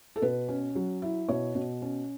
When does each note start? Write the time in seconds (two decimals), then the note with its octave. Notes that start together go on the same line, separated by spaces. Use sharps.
0.16 A4
0.22 B2 B4
0.48 C#4
0.75 F#3
1.02 E4
1.29 B2 C#5
1.55 B2
1.82 C#4